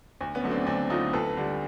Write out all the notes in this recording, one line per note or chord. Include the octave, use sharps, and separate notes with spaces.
D2
B3 C#4
D3 F#3 A3
C4 D4
D2 C4 D4
D3 F#3 A3 D#4 F4
D2 A4 B4
D3 G3